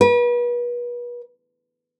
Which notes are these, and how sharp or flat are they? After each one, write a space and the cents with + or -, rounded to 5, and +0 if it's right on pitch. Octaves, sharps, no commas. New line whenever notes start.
B4 -35